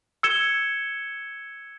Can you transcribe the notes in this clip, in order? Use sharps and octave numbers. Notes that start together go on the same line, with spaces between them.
E6 G#6 C#7 E7 G7